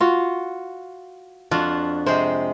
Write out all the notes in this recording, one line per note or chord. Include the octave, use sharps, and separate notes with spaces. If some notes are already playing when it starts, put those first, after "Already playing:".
F4 F#4
F2 D4 F4 F#4
C3 G#3 C5